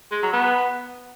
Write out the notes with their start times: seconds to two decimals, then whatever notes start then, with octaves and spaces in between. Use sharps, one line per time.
0.11 G#3
0.22 F#3
0.33 B3